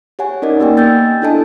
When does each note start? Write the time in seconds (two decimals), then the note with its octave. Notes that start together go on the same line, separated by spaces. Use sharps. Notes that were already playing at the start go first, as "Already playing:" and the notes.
0.19 G4 C#5 F#5 G#5
0.42 C#4 D#4 A#4 D5 D#5
0.60 A#3 B3 G4 D#5 G5 G#5
0.77 G5 E6 G6 A6
1.22 D4 E4 A4 D#5 G#5 A5